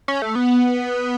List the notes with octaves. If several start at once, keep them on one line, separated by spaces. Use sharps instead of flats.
C#4
A3
B3